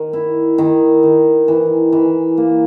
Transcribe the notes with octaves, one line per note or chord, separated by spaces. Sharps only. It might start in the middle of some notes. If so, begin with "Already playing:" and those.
Already playing: D#3
E4
D#3
D#3
E3
E3
A#3